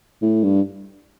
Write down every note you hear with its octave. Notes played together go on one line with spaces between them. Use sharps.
A2
G2